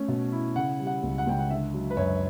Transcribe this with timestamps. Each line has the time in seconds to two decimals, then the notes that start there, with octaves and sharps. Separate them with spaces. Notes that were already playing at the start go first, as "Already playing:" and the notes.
Already playing: A3 C#4
0.08 B2
0.32 E4
0.56 C#3 F#5
0.79 G3
0.87 F#5
1.03 C#2
1.18 F#5
1.27 C#2 G5
1.39 F#5
1.50 D3 E5
1.74 F#3
1.90 B4
1.97 F#2 C#5